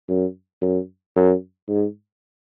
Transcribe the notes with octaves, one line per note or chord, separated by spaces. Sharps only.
F#2
F#2
F#2
G#2